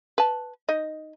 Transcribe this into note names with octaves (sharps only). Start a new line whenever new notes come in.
B4 A5
D#4 D#5